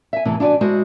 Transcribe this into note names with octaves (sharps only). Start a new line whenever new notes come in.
E5 G#5
A2 C3 E3
D4 E4 F#4 D5 G#5
G#3 E4 F#4 C5 D#5